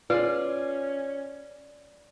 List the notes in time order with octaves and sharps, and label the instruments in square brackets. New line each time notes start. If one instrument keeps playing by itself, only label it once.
[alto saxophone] C#4 [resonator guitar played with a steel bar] F4 G#4 [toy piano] B4 [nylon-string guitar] D5